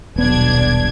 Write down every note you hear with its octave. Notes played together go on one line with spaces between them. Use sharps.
D#1 B1 B3 D4 G#6